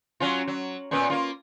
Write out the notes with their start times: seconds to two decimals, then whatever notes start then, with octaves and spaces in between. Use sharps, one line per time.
0.20 F#3 C#4 F4
0.48 F#3
0.91 A#2 B3 C#4
1.10 A#3 F4